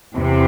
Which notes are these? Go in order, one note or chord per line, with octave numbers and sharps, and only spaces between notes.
E2 C3